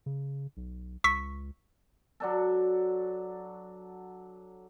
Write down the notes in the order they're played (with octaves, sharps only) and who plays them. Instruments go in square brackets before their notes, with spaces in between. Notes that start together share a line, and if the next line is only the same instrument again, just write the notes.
[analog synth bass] C#3
B1
[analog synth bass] C#2 [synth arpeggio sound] C#6 E6 B6
[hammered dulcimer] F#3 D4 A4